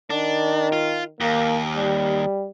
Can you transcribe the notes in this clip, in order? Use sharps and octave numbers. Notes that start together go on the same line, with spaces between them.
D#3 D4
F4
D#2 A#3
G3